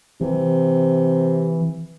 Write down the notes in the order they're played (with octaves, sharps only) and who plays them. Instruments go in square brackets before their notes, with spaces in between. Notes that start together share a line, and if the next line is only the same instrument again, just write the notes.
[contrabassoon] C3 [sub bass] E3